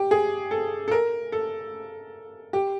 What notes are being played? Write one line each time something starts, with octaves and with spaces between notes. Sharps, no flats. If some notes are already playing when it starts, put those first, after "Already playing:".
Already playing: G4
G#4
A4
A4
A#4
A4
G4